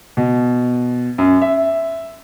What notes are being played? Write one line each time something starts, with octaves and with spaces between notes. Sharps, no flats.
B2
F#2
E5